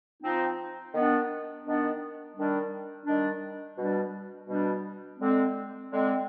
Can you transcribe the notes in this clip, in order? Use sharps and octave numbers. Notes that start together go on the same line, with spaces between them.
F3 C4 D#4
D#3 B3 D4
D#3 B3 D4
D#3 G3 D4
D#3 G3 D4
B2 G3 D4
B2 G3 D4
D3 G#3 C4
D3 G#3 C4